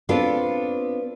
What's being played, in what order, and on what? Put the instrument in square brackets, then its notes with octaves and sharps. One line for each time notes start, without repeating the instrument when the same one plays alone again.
[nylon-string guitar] B3 C4 D4 F4 A4